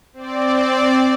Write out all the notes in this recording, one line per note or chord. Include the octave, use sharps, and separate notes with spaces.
C4 D5